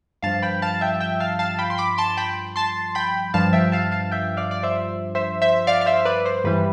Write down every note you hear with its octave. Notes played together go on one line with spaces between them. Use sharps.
G2 F3 F5 A5
G5 B5
F5 A5
E5 G5
E5 G5
F5 A5
F5 A5
G5 B5
C6
B5 D6
A5 C6
G5 B5
A5 C6
G5 B5
G2 F3 F5 A5
E5 G5
F5 A5
F5 A5
E5 G5
D5 F5
D5
C5 E5
C5 E5
C5 E5
D5 F5
F5
C5 E5
B4 D5
C5
G2 E3 G3 B4